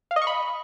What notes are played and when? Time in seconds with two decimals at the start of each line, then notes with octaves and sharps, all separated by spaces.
0.11 F5
0.16 D#5
0.22 C#6
0.27 B5